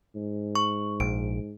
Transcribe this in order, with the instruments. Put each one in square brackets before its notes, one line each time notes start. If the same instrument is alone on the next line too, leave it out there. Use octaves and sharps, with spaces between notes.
[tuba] G#2
[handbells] C#6
[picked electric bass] A#1 [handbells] D7